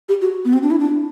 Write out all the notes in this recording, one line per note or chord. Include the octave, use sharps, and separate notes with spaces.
G4
F#4
B3
C4
D4
E4
D4